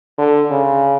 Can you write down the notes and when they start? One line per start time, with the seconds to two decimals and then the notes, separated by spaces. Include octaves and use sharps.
0.18 D3
0.51 C#3